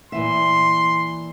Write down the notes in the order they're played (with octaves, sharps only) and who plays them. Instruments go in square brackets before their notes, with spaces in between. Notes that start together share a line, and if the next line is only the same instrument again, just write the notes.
[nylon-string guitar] A#2 E3 E5 [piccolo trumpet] C6